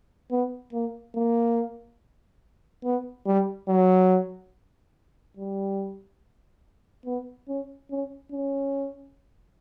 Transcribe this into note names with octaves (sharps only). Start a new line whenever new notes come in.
B3
A#3
A#3
B3
G3
F#3
G3
B3
C#4
C#4
C#4